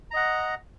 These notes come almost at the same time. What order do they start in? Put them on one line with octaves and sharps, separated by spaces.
A#5 D#5 F#5